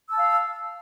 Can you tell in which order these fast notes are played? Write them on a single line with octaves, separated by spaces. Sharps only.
E6 A5 F5